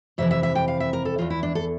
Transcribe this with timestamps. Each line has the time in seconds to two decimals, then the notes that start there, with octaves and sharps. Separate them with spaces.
0.18 F2 C3 E3 E5
0.31 E5
0.43 E5
0.55 G5
0.68 F5
0.80 E5
0.93 A#4
1.05 A4
1.18 E2 C3 E3 F4
1.30 E4
1.43 D4
1.55 A4